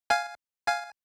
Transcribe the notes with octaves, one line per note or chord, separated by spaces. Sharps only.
F5 G#5
F5 G#5